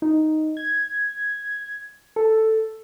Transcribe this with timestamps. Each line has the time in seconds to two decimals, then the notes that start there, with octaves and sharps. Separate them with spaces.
0.02 D#4
0.57 G#6
2.16 A4